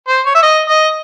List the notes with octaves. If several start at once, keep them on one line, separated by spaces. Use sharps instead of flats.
C5
C#5
E5
D#5
D#5